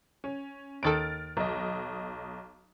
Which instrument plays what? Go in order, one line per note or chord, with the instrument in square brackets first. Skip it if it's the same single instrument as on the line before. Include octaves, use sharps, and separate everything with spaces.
[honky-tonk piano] C#4
[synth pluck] D#2 D#3 A4 [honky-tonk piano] F6 A6 D7
[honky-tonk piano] B1 D#5